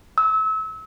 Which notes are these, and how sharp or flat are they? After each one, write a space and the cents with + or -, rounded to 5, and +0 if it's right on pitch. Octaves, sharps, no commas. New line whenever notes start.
E6 -30